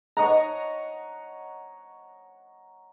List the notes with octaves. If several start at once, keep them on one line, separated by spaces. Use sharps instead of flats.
C#5 D#5 F#5 A#5